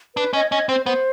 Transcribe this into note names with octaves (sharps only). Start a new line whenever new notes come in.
D4 B4
C#4 D#5
C#4 D#5
C4 C5
B3 C5